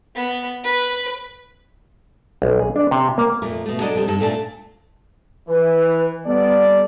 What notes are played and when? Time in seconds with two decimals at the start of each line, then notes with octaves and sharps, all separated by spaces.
0.15 B3
0.63 B4
2.42 B1
2.59 G#4
2.76 D4
2.91 C3
3.18 A#3
3.42 F2 A#2 A3
3.66 B2 A3
3.80 F#3 D4 A4 D5 D#5
3.95 C3 G3 A4
4.08 G2 A4
4.20 A#2 A3 D4 A5
5.49 E3 B4
6.26 G3 B3 A4 D5